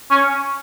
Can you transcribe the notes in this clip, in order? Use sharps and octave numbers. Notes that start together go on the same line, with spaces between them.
C#4